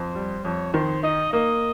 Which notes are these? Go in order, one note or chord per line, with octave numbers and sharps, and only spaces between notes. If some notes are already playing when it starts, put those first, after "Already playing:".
Already playing: F2 C5
G3
F2 C#5
D#3 C5
D#4 D#5
A#3 D#5